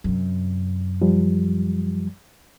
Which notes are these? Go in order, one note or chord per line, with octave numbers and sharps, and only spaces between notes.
F#2 C3
F3 G3